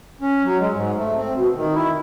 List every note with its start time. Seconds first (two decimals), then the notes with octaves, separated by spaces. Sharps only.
0.21 C#4
0.43 F#3
0.58 G#3
0.72 G#2
0.97 A3
1.16 C4
1.35 B2
1.55 D#3
1.75 E4